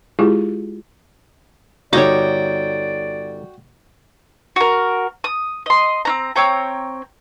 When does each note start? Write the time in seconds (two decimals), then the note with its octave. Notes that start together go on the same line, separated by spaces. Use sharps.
0.19 G#3 E4 F4 G4 G#4
1.93 G1 D#4 F#4 C#5 D5 G5 D6
4.56 F#4 A#4
5.24 D#6
5.66 D#5 C6
6.05 C4 C#4 A#5
6.36 C4 C#5 G5 A#5